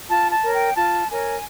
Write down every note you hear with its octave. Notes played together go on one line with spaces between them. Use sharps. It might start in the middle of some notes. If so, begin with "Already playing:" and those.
F4 A5
A5
A#4 C#5
G5
F4 A5
A#4 C#5 G#5